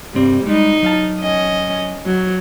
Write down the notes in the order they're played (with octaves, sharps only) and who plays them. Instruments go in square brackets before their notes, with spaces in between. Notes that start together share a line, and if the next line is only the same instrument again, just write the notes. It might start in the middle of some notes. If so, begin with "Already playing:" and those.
[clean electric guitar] C2 G2 C4 [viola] G3
[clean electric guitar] G3 G#3 [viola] D#4
[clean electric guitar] F#3 F5 A5
[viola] C#4 D#5
F#3